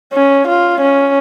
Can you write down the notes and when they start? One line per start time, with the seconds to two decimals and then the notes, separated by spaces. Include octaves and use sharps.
0.13 C#4
0.47 F4
0.81 C#4